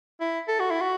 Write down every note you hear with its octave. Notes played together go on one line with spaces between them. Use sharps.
E4
A4
F#4
E4
F#4